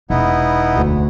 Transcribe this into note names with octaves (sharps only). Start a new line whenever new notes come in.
E1 B3 D#4 E4
D2